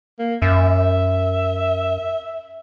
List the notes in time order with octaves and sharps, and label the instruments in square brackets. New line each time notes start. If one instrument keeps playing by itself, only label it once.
[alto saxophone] A#3
[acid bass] F#2 [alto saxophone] E5